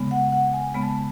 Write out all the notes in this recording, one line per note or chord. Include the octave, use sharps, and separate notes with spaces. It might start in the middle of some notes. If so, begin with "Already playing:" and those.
Already playing: C#3 G#3 B3
F#5
F#5
G#5
C#3 G#3 B3 B5
A5
B5